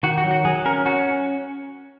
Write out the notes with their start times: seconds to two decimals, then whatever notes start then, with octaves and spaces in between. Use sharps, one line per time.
0.03 D#3 F#4
0.18 F#4
0.23 F#3
0.31 F#4
0.45 F#3 G#4
0.65 C#4 A#4
0.85 C#4 F#4